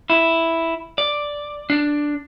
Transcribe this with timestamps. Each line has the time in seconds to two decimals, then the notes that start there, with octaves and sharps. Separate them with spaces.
0.10 E4
0.98 D5
1.70 D4